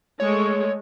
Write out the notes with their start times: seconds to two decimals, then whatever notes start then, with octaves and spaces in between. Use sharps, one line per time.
0.20 G#3 A3 C#5